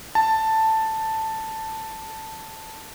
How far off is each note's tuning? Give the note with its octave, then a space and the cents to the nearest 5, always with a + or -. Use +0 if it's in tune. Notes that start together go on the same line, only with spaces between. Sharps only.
A5 +5